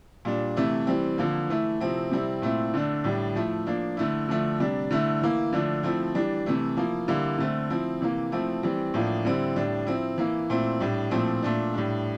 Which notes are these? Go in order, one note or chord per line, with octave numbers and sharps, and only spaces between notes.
A#2 G3 D4
C3 E3 A3 E4
E3 G3 C4
D3 F3 A#3
E3 A3 E4
C3 F3 C4 E4
C3 G3 C4 E4
A#2 A3 C4 E4
D3 A3 D4
A2 G3 D4
F3 A3 E4
F3 A#3 D4
D3 A3 E4
D3 F3 A3
C3 G3 D4
D3 A3 E4
E3 A#3 E4
D3 F3 A3 D4
F3 A3 C4 E4
E3 G3 D4
C3 E3 A3 E4
F3 A#3 E4
D3 G3 A#3 E4
D3 A3 C4
F3 C4 E4
C3 E3 A#3
F3 A3 C4 E4
E3 G3 C4
A2 F3 A#3 D4
D3 G3 C4 E4
A2 G3 D4
F3 C4 E4
E3 A#3 E4
A#2 A3 C4 E4
A2 G3 D4
A#2 F3 A3 C4 E4
A#2 A3 D4
A2 G3 D4